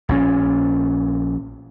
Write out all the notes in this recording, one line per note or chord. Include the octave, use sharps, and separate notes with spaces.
A#1 A#2 C#4